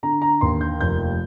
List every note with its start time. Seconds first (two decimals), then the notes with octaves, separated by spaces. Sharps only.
0.03 D3 A#5
0.22 A#5
0.41 D#2 C6
0.61 G6
0.81 F1 G6